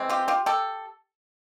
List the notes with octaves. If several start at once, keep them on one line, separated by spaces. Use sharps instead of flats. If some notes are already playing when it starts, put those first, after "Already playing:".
Already playing: E3 G#3 C4
F4 G4
F4 G4
G4 A4